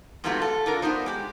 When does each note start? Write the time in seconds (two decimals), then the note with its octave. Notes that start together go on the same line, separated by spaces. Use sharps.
0.24 G#2 C3 A3 B3 F4 F#4
0.42 A4
0.66 D3 F4 A#4
0.82 B3 C4 D4 D#4 C5
1.06 G#3 G4